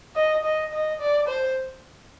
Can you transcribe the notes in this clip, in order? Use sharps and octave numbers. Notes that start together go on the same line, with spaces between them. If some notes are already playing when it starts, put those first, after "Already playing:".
D#5
D#5
D#5
D5
C5